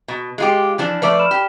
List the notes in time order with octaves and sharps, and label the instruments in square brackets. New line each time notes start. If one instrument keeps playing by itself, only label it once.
[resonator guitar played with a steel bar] B2
G#3 F4 G4
E3 F3 D4
[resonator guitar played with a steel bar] F3 A3 D5 [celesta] B4 E5
[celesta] B5 F6 E7
[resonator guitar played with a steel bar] G4